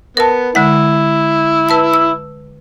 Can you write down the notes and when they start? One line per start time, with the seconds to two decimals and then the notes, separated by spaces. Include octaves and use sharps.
0.17 B3 A#4 A5
0.55 D3 G#3 E4 F#5
1.69 B4 A5 E6
1.94 E6